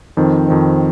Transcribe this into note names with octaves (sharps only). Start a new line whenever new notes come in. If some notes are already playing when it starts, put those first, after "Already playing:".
F2 D#3 C4
F2 D#3 C4